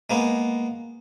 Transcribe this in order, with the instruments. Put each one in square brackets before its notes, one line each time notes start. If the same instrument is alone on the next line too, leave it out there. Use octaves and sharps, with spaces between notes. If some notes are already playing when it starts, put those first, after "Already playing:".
[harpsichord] G#3 A#3 B3